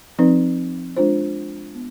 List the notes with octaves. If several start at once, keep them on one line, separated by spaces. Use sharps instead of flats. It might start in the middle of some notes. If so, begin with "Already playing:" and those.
F3 C4 D#4 B4
G#3 D4 F4 C5
B3